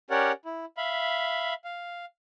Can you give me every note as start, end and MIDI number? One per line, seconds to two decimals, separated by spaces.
0.10 0.32 61
0.10 0.32 67
0.10 0.32 70
0.10 0.32 73
0.10 0.32 74
0.10 0.32 78
0.45 0.65 64
0.77 1.54 76
0.77 1.54 77
0.77 1.54 83
1.64 2.05 77